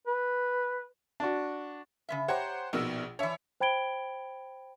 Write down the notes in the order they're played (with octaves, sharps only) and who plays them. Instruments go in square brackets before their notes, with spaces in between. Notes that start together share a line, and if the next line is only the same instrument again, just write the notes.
[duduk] B4
[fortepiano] D4 F#4
[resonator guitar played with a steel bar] C#3 G#3 E5
[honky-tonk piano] G4 C5 F#5 [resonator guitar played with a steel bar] C#5 A#5
[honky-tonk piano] A#1 B2 E6 [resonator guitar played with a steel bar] D#4 A#4
[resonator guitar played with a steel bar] E3 D4 [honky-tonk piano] C#5 E5
[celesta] C5 G5 B5 G#6 D7 G7